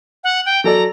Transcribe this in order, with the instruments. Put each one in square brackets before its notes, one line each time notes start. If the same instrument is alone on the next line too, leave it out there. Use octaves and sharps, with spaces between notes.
[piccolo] F#5
G5
[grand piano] F#3 A4 D5 [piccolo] A#5